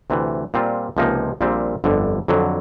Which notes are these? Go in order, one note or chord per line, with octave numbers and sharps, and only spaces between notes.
D2 C3 E3
A#2 G3 C4 F4
C#2 C3 F3 A#3 D#4
A#1 A#2 G3 C4
G1 F2 D3
F2 D3 F#3